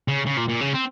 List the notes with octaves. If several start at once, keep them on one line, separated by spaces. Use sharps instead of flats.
C#3
C#3
A#2
A#2
C#3
C4